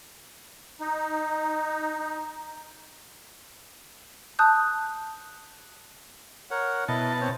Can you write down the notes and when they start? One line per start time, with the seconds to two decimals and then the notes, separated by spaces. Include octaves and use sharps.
0.81 D#4
1.98 D#4
4.39 A5 D#6 F#6 G6
6.51 A#4 C#5 F#5
6.88 B2 E4 D#5 A5
7.21 C4 C5 C#5